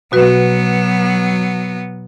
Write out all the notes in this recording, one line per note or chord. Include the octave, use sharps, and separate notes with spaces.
B2 F#3 B3 F#4 B4